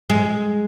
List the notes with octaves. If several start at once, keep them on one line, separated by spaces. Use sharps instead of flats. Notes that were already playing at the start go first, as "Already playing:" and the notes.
G#3